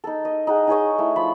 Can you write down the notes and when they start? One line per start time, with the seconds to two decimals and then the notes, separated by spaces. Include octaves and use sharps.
0.04 D#4 A4
0.25 D#5
0.47 D#4 G#4 F#5
0.67 D#4 G#4 C#5 D#5
0.98 A3 E4
1.16 F3 B5